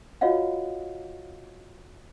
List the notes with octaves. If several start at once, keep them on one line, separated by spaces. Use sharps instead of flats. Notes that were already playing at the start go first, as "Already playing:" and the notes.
F4 F#4 C#5 D#5 F5 F#5